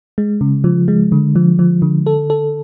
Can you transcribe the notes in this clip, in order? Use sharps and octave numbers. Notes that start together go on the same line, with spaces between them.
G#3
C#3
F3
G#3
D3
F3
F3
D3
A4
A4